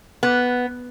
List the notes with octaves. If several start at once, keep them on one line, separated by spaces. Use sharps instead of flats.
B3